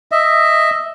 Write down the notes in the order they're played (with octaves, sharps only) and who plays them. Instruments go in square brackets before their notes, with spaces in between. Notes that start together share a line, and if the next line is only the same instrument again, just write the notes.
[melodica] D#5 E5